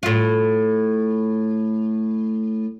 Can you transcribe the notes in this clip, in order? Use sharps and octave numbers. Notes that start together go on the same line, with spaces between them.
A2 F4